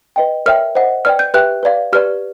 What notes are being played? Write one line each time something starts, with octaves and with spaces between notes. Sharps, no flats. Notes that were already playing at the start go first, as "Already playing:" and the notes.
B4 D#5 G5
A#4 C#5 E5 G5 F6
C5 D#5 F#5
B4 D5 G5 F6
G6
G4 B4 E5 G5 F#6
B4 D5 F5
G4 B4 D5 F6